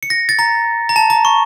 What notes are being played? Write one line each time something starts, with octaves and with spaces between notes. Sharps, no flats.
C#7
A#6
A6
A#5
A#5
A5
A#5
C#6